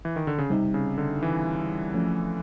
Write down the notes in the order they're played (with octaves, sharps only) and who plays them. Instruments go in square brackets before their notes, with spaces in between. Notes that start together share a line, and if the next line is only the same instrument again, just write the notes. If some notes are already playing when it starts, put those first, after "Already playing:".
[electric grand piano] E3
D#3
D3
C#3
[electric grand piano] C3 [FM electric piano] G3 C4 D#4
[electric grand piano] C#3
D3
E3
[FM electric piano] F3 A3 C#4